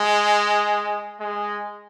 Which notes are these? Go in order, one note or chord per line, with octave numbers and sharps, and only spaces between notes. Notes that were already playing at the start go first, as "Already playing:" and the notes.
Already playing: G#3
G#3